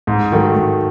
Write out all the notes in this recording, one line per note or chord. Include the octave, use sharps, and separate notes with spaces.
G#2
D#3 F#3 A3
G#2